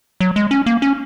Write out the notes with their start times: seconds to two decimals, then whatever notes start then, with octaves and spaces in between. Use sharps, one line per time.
0.20 F#3
0.36 G#3
0.51 C#4
0.66 A#3
0.82 C#4